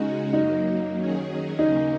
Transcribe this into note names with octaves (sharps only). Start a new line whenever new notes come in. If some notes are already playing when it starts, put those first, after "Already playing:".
Already playing: C#3 G#3 C#4 D#4 F#4
F#2 F#3 A#3 D#4
D#3 F#3 C#4 G#4
D#2 C#3 A#3 C#4 D#4